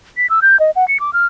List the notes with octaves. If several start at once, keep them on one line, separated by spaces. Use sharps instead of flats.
B6
E6
G6
D#5
F#5
C#7
D6
F6